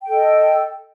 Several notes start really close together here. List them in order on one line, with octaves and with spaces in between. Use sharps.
G5 A4 D#5